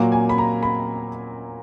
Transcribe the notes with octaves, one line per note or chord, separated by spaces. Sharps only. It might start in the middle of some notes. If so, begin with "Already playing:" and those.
Already playing: A#2 F#3 A#3
G#5
B5
A#5
B5